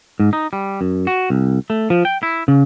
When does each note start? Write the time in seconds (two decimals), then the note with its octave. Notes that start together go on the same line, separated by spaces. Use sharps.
0.20 G#2
0.33 D#4
0.53 G3
0.81 F#2
1.07 F#4
1.30 C2
1.70 A3
1.90 F3
2.05 G5
2.23 E4
2.48 C#3